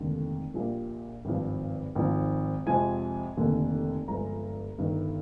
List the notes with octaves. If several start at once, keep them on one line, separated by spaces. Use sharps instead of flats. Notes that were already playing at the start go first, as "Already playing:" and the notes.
Already playing: F1 D#2 D3 G#3
A#1 A#2 G3 A#3
G#1 G2 F3
G#1 G#2 F3
F2 C3 F3 G#3 G#5
F1 D#2 D3 G3 A#3
G1 G2 F3 G#3 A#5
G1 G2 D#3